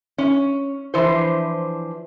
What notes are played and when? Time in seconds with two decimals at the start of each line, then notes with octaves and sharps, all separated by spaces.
0.18 C#4
0.94 E3 F3 D4 C5